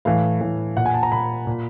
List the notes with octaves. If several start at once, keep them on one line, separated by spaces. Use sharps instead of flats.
A2 E3 F5
A2 E3
A#2 F#5
G#5
A5
A#5
A#2 B5
A#2